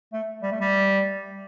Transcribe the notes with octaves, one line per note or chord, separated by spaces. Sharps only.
A3
G3
A3
G3